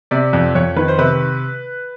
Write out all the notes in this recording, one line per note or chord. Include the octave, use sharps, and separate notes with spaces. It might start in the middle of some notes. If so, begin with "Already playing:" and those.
C3 D5
F2 D5
F2 C#5
D#3 B4
C5
C3 B4